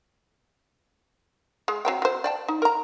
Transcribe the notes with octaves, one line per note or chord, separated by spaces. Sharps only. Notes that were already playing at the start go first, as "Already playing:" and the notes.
G#3
F#3 C4 G5
F#3 C5
D5 G5 A5
D#4
A#4 A#5